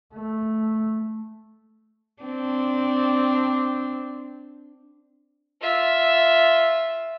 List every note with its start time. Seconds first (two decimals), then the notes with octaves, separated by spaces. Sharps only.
0.14 A3
2.23 C4 D4
5.61 F4 E5